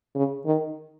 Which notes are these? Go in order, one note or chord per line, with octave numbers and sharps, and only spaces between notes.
C#3
D#3